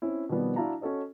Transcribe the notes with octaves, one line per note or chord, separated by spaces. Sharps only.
C4 C#4 E4
B2 D#3 F3 G3 B3 C4
D4 E4 F#4 F5 A5 A#5
C#4 F#4 A4 C#5 D#5